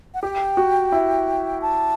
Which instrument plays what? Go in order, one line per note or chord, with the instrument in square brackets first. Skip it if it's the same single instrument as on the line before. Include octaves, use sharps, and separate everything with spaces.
[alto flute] F#5
[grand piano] G4 [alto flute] G5
[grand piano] F#4
E4
[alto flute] A5